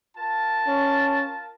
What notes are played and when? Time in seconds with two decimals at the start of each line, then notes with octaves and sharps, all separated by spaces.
0.18 F4 A#4 A5
0.67 C#4